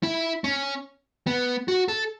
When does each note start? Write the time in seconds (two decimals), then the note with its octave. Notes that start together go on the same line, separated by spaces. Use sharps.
0.03 E4
0.44 C#4
1.27 B3
1.68 F#4
1.88 A4